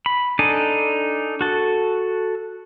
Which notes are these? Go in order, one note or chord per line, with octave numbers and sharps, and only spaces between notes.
B5
D4 D#4 A4 G#5
F#4 A4